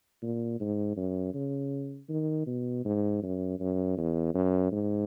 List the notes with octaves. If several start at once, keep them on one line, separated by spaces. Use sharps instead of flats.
A#2
G#2
F#2
C#3
D#3
B2
G#2
F#2
F#2
E2
F#2
G#2